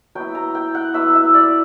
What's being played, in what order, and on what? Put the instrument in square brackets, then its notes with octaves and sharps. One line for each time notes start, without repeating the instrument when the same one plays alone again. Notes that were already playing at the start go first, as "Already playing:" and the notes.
[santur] F#3 B3 E4 G5
A#5
G5
F#5
F#3 B3 E4 E5
E5
D5